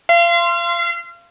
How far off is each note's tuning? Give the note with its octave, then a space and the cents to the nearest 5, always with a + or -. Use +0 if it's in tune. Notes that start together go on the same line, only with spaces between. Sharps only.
F5 -35 C6 +0